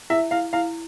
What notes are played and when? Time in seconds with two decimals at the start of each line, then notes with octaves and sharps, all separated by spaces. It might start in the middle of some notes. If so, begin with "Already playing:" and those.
0.10 E4 E5
0.31 E4 F5
0.53 E4 F5